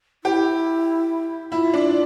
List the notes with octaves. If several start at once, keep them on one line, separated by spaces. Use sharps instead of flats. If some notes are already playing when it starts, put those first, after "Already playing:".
E4 G4
E4 F4
D4